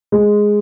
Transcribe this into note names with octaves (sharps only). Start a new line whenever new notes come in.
G#3